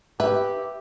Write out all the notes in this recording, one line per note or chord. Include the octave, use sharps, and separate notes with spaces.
G4 B4 E5